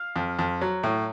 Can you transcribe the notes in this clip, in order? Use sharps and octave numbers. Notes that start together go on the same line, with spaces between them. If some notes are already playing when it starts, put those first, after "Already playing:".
Already playing: F5
F2
F2
F#3
A2